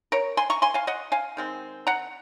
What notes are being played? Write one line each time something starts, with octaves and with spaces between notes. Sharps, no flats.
A#4 C#5
G#5 C6
A#5 C#6
G#5 C6
F5 G#5
D#5 F#5
F5 G#5
D#3 G#3 C4
F#5 A#5